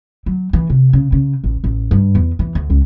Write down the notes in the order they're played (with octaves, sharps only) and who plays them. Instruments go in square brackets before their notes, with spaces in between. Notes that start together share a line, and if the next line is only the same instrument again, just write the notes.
[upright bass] F#3
E3
C3
C#3
C#3
A1
A1
G2
E2
E3
D2
C#2